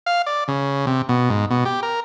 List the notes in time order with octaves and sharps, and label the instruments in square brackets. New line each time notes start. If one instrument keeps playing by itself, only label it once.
[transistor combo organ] F5
D5
C#3
C3
B2
G#2
B2
G4
A#4